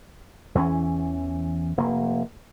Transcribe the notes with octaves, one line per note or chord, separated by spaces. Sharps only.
E2 E3 A#3 C#4
F1 A#3